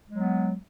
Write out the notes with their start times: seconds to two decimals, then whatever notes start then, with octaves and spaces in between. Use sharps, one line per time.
0.09 G#3
0.12 F#3
0.16 B3